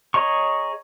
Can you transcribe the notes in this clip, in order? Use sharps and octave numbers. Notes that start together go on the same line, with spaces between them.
G#4 C#5 D#5 A#5 C#6